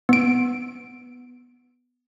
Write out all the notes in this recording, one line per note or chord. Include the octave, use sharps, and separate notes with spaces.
B3 D7